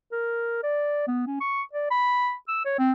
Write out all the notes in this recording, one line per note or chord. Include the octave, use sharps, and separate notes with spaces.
A#4
D5
B3
C#4
C#6
D5
B5
E6
C#5
C4